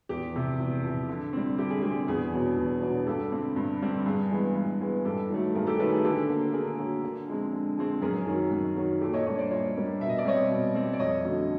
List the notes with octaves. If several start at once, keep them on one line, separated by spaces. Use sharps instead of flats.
E2 G4
C3 F3
E2
C3 F3
D3
G3 C4
D3 G4
G#4
G3 C4 G4
E2 G#4
B2 F#3 B3 D4
E2
B2 F#3 B3 D4
G2 G4 A4
D3 G3 C4
G2
D3 G3 C4
G2 G#4
E3 G#3 B3
G2
E3 G#3 B3
G2 G4 A4
D#3 F#3 A3
G2 G#4 A#4
G4 A4
D#3 F#3 A3 A4 B4
G#4
D3 G4 A4
F#3 A#3
D3 G#4 A#4
F#3 A#3
D3
F3 G#3 C4
D3
F3 G#3 C4
F#2 G#4 A#4
D#3 F#3
F#2
D#3 F#3
A#2 G4 A4
C#5 D#5
G3 A#3 D4 C#5 D#5
C5 D5
A#2 C#5 D#5
G3 A#3 D4
B2 E5
D#5
D5
G3 C4 C#5 D#5
B2
G3 C4
D5
F2 C#5 D#5
D3 F#3 A3 C#4